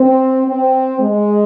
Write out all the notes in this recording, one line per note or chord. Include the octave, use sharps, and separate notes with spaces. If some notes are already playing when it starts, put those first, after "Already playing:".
Already playing: C4
C4
G#3